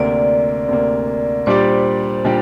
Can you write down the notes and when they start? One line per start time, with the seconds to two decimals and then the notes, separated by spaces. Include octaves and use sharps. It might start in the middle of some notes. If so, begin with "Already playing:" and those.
Already playing: D2 C3 A#3 D5
0.69 D2 C3 A#3
1.46 A#2 G3 D4 G4 C5 D5
2.24 A#2 G3 D4 G4 D5